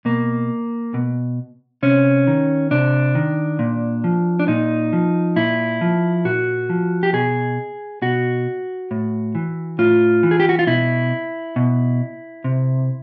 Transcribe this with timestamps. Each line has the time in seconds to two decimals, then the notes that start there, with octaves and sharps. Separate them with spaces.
0.05 B2 A#3
0.94 B2
1.83 C3 C#4
2.27 D#3
2.71 C3 D4
3.15 D#3
3.59 A#2
4.04 F3
4.39 D4
4.48 A#2 D#4
4.93 F3
5.36 A#2 E4
5.81 F3
6.25 A#2 F#4
6.70 F3
7.03 G4
7.13 B2 G#4
8.02 B2 F#4
8.91 A2
9.35 E3
9.79 A2 F4
10.23 E3
10.31 G#4
10.40 G4
10.49 F#4
10.59 F4
10.67 B2 E4
11.56 B2
12.44 C3